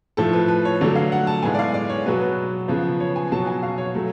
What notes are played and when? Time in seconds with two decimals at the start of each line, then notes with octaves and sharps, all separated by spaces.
0.17 A2 F3 A3 A4
0.33 B4
0.48 B4
0.65 C#5
0.81 D3 F#3 A3 D5
0.96 F5
1.12 F#5
1.27 A5
1.42 A2 G#3 B3 G#5
1.55 D5
1.59 F5
1.74 D5
1.90 C#5
2.06 B2 F#3 B3 B4
2.21 B4
2.68 C#3 F3 B3
3.00 C#5
3.16 G#5
3.32 B2 F#3 B3 A5
3.47 G#5
3.63 F5
3.78 C#5
3.95 F#3 A3